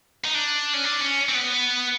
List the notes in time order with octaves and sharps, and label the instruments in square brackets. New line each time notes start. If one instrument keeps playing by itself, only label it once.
[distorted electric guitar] D#4
D4
C#4
D4
C#4
C4
B3